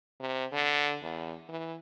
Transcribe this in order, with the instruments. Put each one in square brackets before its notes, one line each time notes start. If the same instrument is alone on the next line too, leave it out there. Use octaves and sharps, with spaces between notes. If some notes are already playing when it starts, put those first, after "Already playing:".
[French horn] C3
D3
E2
E3